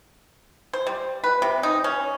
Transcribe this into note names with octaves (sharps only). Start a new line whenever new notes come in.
C5
G3
B4
C3
D#4
C#4